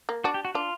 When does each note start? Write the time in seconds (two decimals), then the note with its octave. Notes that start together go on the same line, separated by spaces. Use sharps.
0.09 A#3
0.24 D4 F#4
0.34 G4
0.45 F#4
0.55 D4 F4